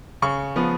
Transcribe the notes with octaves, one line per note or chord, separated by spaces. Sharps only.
C#3 C#6
F3 B3